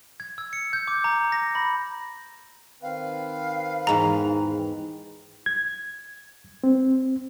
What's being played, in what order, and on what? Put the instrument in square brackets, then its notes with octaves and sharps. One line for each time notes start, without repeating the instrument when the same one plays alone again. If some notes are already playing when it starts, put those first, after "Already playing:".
[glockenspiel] G#6
E6
C#7
G6
D6
A#5
A#6
B5
[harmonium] D#3 C4 B4 [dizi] F5
[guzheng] E2 G#2 G#3 [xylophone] A#5
[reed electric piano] G#6
C4